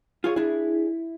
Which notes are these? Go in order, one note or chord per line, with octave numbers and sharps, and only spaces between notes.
F4 G#4 C#5
D4 E4 G#4